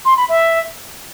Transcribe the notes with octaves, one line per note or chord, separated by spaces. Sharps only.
C6
B5
E5